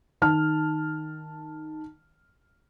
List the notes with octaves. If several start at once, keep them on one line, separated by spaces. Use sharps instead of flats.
D#3 A5 F6